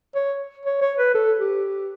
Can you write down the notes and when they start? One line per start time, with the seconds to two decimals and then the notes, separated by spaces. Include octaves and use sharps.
0.15 C#5
0.65 C#5
0.81 C#5
0.98 B4
1.14 A4
1.40 G4